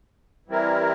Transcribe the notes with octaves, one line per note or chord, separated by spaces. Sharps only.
E3 G3 C4 E4 A#4